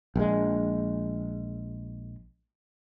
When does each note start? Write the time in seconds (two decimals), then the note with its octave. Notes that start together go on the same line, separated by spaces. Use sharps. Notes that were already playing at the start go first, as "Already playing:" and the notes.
0.16 A#1 G#3